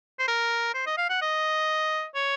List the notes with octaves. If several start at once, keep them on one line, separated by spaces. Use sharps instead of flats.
C5
A#4
C5
D#5
F5
F#5
D#5
C#5